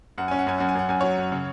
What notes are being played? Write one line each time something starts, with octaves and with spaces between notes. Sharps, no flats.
F#2 F#5
C#4 G#5
F#5
F#2 G#5
F#2 F#5
G#5
F#2 F#5
F#2 G#5
F#3 C#5 F#5
F#2
C#3